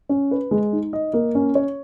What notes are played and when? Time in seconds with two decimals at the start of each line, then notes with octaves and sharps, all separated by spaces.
0.09 C#4
0.31 B4
0.51 G#3
0.72 D#4
0.93 D#5
1.13 A#3
1.35 C#4
1.55 C#5